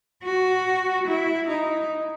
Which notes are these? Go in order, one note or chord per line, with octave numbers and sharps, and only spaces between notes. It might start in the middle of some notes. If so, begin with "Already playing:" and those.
F#4
E4
D#4